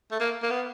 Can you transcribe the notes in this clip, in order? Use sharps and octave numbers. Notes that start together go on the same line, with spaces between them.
A3
A#3
A#3
B3